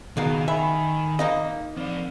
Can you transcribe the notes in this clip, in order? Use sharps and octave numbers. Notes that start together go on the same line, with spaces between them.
C#2 B2 D#3 A#3
E5 G#5 B5
A#3 D#4 D#5 F5
F3 C4 D5